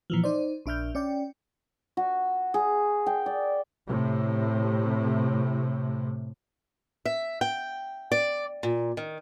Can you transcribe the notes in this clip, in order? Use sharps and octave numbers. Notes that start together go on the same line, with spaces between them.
A#2 E3 F3
D#4 C5 D5
A#1 D4 E5 F6 G6
C#4 D5 G5
F#4
G#4
G5
D5
A2 C3
E5
G5
D5
A#2
D#3